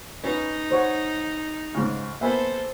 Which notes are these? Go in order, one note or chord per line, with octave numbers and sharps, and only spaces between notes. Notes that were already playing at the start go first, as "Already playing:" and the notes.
C#4 D#4 B4
C5 C#5 F#5
G#2 C#3
A#3 B3 A4 C5 E5 G#5 B5